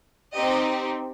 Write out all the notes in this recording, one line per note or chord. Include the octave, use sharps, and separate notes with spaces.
C4 D#4 G4 D#5